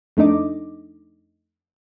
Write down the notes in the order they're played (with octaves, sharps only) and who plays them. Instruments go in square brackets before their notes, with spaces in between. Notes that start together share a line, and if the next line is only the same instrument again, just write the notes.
[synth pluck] F2 A3 D4 D#4 D#5 D6